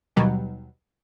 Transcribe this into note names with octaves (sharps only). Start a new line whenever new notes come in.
D#2 B2 F#3 G3